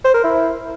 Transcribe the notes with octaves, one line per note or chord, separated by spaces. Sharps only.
C5
A#4
E4